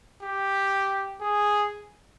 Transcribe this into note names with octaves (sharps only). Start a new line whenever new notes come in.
G4
G#4